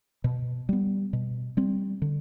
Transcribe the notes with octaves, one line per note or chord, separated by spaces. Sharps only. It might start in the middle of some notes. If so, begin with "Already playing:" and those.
B2
G3 B3
B2
G3 C4
D3